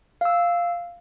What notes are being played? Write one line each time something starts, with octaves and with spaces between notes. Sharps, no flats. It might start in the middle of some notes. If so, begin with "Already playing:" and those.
F5 E6